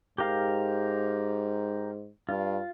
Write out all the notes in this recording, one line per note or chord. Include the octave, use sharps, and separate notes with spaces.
G#2 G4 A#4 F5
G2 F4